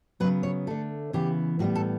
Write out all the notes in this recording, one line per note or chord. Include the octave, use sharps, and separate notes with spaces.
C#3 F#3 B3 B4
C#5
D3 A3 A4
C#3 E3 B3 G4
A2 G3 B3 F#4
A4